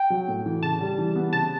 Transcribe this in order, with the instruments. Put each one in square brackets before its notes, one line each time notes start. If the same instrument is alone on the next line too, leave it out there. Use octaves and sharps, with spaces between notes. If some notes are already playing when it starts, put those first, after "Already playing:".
Already playing: [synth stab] G5
[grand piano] F#3
A2
E3
[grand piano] C#3 [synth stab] A5
[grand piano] G3
E3
B3
[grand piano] C#3 [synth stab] A5